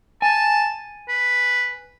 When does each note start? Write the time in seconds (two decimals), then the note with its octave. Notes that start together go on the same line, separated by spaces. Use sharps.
0.22 G#5 A5
1.08 B4